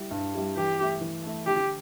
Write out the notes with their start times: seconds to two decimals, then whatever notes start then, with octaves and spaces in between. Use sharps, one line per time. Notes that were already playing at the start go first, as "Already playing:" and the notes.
Already playing: G3 E4 G4
0.11 G2
0.34 G3 E4 G4
0.57 E3 G4
0.79 A3 E4
1.01 E3
1.24 A3 E4
1.46 D3 G4